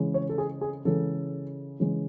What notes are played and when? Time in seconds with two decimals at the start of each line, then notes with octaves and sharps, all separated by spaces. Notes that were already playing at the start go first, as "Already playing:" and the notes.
Already playing: C#3 E3 G#3
0.14 C#5
0.29 A4
0.38 G#4
0.61 G#4
0.85 C#3 E3 G#3 A4
1.80 C#3 E3 G#3